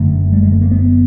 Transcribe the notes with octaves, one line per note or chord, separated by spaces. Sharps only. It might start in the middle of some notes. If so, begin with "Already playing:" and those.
Already playing: F#1 F#2 D3 A3
G3
G#3
A3
A#3
B3